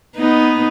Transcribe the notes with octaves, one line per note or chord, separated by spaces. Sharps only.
B3 D#4